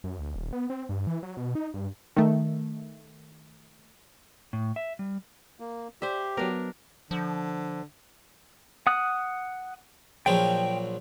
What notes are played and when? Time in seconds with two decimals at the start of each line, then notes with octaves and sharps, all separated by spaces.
0.04 F#2
0.19 D2
0.35 D#1
0.53 B3
0.70 C4
0.89 G2
1.07 E3
1.23 F#3
1.37 B2
1.55 D#4
1.74 G2
2.16 D#3 A3
4.53 A2
4.76 E5
4.99 G3
5.60 A#3
6.02 G4 C5 D5 E5
6.37 F#3 B3 D4 A#4
7.11 D3 F3
8.87 F#5 D#6 F#6
10.26 A#1 F3 F#3 G5